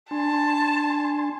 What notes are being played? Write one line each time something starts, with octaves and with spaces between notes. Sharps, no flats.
D4 G#5 A5 C6